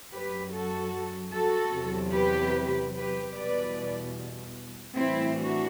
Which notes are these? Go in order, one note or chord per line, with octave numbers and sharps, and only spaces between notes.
F#2 F#3 G4 B4
F#4 A4
F#4 A4
E2 C3 F#3
G4 B4
G4 B4
E2 B2 G3 B4 D5
A2 E3 G3 C4 E4
D4 F#4